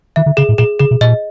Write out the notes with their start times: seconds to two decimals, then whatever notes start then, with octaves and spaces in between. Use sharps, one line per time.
0.16 D#3 E5
0.26 D3
0.37 C#3 G#4
0.49 A2
0.58 A#2 G#4
0.80 C#3 G#4
0.91 B2
1.01 A#2 D#5